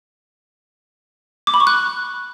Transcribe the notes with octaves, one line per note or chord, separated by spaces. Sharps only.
D6
B5
C#6
F#6